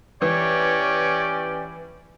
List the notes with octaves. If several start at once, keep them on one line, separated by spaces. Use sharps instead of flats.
E3 C#4 G4 C#5 D5